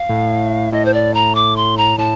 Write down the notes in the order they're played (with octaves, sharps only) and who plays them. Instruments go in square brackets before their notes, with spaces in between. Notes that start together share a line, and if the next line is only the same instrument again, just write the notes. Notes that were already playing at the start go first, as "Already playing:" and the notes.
Already playing: [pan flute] F5
[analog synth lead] A2
[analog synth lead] A2 [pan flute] D#5
[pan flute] C5
D5
A#5
D6
C6
A#5
[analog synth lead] A2 [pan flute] A5